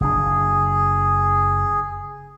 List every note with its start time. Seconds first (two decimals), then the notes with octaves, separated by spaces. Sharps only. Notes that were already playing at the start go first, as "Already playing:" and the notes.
0.01 F#1 C#3 D4 G#4